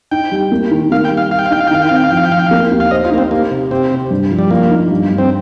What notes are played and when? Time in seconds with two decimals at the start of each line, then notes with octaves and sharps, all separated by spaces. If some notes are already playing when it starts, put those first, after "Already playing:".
0.11 D#4 G5
0.32 G3
0.52 A#3
0.71 D#3
0.91 A#3 F5
1.05 G5
1.11 G3
1.17 F5
1.31 G3 F5
1.39 G5
1.46 F5
1.51 D#4 G5
1.61 F5
1.67 G5
1.71 D#3 F5
1.82 G5
1.89 C4 F5
1.96 G5
2.04 F5
2.11 F3 G5
2.17 F5
2.25 G5
2.31 F3 F5
2.39 G5
2.47 A#3 F5
2.71 D#2
2.80 F5
2.91 C5 D#5
3.05 F4
3.11 A#3 D#4
3.18 C4
3.31 A#3 G4
3.51 C3
3.71 C4 G4
3.91 C3
4.11 G2
4.31 F3
4.39 G3
4.51 F3 A#3
4.71 D#4
4.91 G2
5.11 G2
5.18 C4